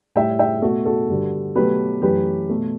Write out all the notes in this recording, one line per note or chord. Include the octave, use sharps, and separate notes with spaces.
A2 G3 E5 G5
E5 G5
B2 A3 F#4 A4
F#4 A4
G2 D3 G3
B2 F#3 A3 G4 B4
F#2 E3 A3 G4 B4
B2 A3